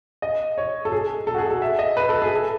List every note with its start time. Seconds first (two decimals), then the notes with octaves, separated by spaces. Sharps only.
0.22 D#5
0.58 C#5
0.85 A4
0.92 G#4
1.27 A4
1.34 F#4
1.38 G#4
1.51 A4
1.62 E5
1.79 D#5
1.97 B4
2.09 A4
2.22 G#4
2.35 A4